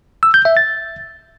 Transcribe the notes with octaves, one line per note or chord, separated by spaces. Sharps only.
E6
G6
E5
A6